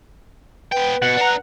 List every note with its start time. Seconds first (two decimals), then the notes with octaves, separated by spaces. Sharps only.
0.72 B3 B4 G5
1.02 B2 F#5
1.17 D4 A#5